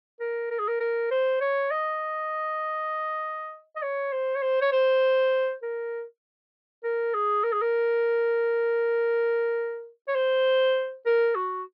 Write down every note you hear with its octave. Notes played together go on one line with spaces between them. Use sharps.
A#4
A#4
G#4
A#4
A#4
C5
C#5
D#5
D#5
C#5
C5
C#5
C5
C#5
C5
A#4
A#4
G#4
A#4
G#4
A#4
C#5
C5
A#4
F#4